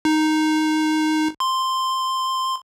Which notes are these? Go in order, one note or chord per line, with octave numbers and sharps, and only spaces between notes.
D#4
C6